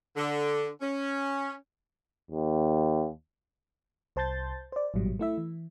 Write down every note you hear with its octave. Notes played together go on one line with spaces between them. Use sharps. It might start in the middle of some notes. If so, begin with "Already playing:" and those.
D3
C#4
D#2
C2 C5 A5 C6 G6 A6
C5 D5
A1 G#2 B2 F#3 G3
A3 E4 E5
E3